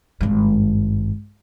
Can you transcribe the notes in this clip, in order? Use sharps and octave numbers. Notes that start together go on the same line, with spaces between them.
G#1 G2